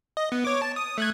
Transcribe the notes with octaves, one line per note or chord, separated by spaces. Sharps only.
D#5
B3
C#5 D6
A5
D#6
A3 F#6 G#6